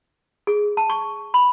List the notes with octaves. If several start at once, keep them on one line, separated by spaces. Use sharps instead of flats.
G#4
A5
C#6
B5